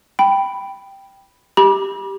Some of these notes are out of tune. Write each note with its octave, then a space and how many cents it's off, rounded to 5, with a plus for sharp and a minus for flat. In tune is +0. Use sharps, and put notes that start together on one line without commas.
G5 +0 B5 +0
G4 +0 B5 -40